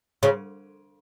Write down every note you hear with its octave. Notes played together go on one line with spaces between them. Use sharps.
C#3